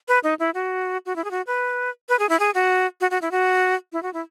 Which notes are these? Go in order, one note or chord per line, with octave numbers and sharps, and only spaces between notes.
B4
D#4
E4
F#4
F#4
E4
G#4
F#4
B4
B4
G#4
E4
G#4
F#4
F#4
F#4
E4
F#4
E4
F#4
E4